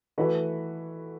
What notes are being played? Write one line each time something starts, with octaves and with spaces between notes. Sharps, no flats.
E3 A3 F#4 B4